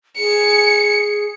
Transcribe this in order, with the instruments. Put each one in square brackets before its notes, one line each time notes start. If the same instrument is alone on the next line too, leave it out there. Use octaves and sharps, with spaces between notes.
[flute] G#4 [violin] C#7